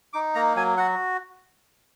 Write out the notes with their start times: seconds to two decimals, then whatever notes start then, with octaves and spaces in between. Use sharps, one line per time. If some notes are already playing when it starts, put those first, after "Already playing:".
0.13 D#4 D6
0.35 A#3 A#5
0.56 F#3 G#5
0.77 F#4 F#5